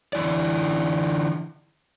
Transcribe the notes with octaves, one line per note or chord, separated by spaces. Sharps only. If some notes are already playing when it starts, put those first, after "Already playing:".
D3 E3 E4 D5